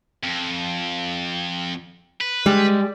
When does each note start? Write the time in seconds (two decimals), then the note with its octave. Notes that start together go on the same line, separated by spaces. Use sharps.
0.23 F2
2.21 B4
2.46 G3 G#3